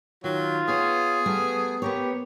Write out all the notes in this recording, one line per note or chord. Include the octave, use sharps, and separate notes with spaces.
D#3 F#3 F4
B3 G#4 C#5
G3 A3 B3
B3 G4 A#4 C#5